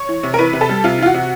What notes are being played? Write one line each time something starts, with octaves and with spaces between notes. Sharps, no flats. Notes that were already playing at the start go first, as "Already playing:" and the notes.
Already playing: C#5
E3
C3
A#4
E3 B4
C3
A4
G3
C3 F4
E3 F4
F#4
C3